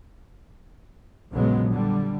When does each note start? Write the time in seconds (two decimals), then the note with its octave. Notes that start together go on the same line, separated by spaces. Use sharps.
1.33 A#1 F2 C#3 F#3 G#3 B3
1.70 D3 G3